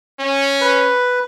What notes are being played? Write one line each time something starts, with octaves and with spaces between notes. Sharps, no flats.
C#4
B4